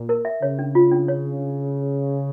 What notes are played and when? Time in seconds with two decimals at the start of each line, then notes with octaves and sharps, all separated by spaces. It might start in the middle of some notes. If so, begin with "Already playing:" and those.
Already playing: A#2
0.09 A#4
0.25 E5
0.42 C#3 C#5
0.59 D4
0.75 F4
0.91 D4
1.08 C#5